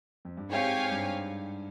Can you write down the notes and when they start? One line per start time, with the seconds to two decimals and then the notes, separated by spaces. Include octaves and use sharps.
0.25 F2
0.37 G2
0.49 G#2 C4 G4 C#5 F5 G#5
0.91 G2